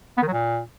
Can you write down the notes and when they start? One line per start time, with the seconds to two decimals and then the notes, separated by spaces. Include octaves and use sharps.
0.17 B3
0.22 D#3
0.28 F#3
0.33 A#2